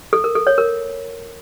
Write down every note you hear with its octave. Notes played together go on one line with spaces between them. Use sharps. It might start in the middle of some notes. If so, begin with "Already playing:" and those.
A4
A#4
A4
C#5
A#4